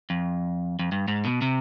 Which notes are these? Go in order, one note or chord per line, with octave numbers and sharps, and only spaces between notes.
F2
F2
G2
G#2
B2
C3